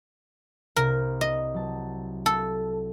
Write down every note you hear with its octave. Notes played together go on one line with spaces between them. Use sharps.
C2 A#4
D#5
F#3 A5
A4